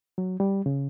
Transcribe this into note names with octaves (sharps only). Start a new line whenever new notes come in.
F#3
G3
C#3